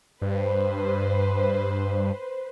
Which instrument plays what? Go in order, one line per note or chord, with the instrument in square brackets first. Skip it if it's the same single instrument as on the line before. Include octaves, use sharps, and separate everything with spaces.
[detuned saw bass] G2 [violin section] B4 C5